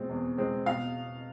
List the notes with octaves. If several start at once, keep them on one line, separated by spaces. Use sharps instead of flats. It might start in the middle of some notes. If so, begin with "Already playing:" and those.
Already playing: B2 G#3 C4
E2
B2 G#3 C4
B2 F5